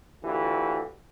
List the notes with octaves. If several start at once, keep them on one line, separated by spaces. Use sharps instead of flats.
D2 E3 F4 G4